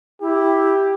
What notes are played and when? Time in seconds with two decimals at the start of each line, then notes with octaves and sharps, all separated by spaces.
0.21 E4 G4